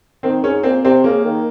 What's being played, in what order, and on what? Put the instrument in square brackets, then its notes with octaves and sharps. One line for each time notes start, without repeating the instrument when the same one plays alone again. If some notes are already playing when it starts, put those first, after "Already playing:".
[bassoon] D#3 [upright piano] C4
[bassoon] G#2 [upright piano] C#4
[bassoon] A#2 [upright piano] C4
[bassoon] C3 [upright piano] C4
[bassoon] C#3 [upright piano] A#3
[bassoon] D#3